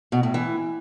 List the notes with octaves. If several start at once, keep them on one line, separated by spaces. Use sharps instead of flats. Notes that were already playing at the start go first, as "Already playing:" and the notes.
B2
A2
E3